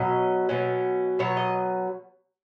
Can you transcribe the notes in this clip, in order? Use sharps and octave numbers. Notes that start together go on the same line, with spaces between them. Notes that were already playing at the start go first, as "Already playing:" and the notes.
Already playing: B2 F#3 C#4 D#5
B2 F#3 C#4
B2 F#3 C#4 C#5
D#5